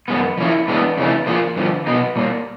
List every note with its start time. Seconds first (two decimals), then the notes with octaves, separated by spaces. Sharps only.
0.08 F#2 D#3 G#3 B3
0.38 F3 A#3 C#4 E4
0.68 A2 E3 G#3 B3 D4
0.98 F2 C#3 E3 A3 C#4
1.27 F3 A#3 D4 F4 G#4
1.56 G2 D3 F3
1.87 B2 F#3 B3 D#4
2.16 A#2 G3 A#3